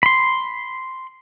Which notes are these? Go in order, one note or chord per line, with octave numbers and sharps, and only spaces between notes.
B5 C6